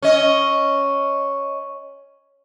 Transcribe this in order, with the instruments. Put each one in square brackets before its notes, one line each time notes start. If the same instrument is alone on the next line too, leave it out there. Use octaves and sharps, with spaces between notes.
[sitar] C#4 D#5